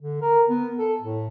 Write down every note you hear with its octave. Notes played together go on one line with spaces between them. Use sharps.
D3
A#4
B3
A4
A2